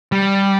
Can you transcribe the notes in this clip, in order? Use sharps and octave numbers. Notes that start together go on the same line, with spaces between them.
G3